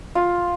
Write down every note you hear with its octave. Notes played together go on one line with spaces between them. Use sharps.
F4